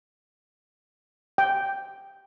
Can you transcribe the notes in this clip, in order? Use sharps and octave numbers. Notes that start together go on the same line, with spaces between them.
G5